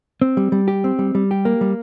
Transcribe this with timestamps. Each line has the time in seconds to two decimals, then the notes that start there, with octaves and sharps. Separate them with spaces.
0.22 C4
0.37 G3
0.52 G3
0.68 G4
0.84 C4
0.99 G3
1.15 G3
1.31 G4
1.45 A#3
1.61 G3